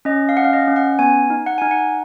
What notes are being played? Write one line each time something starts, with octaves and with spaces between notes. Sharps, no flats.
C#4 D#5
F5
C#4 F#5
F5
D#5
C#4
F#5
B3 G#5
D#4
F#5
D#4 G#5
F#5